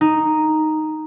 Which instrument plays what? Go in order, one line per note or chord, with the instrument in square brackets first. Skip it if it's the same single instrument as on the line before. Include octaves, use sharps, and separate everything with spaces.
[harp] D#4